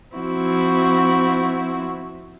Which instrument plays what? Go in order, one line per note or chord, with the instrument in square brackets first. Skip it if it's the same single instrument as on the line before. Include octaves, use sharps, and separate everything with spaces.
[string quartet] F3 C4 E4 F#4